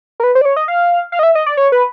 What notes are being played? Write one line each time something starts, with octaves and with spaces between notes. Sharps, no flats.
A#4
B4
C5
D5
C#5
D#5
F5
F5
D#5
E5
D#5
D5
C#5
B4